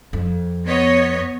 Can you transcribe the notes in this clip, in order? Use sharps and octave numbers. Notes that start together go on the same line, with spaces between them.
F2
B3 C#5 D#5